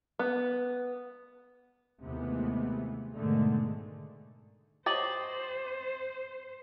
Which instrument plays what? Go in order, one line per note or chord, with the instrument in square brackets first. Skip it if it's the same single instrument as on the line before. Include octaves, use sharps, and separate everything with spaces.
[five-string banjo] B3
[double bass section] D#2 C3 E3 G#3 A3 B3
G#2 B2 D3 D#3 G#3 A3
[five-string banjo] G4 C#5 D#5 [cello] C5 [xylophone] A6 F#7